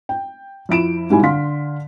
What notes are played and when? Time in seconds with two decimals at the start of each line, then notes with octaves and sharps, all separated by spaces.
0.09 G5
0.69 F2 E4 D7 E7
1.10 G#2 B2 G3 E4 G#5
1.23 D3 F5 C6 B6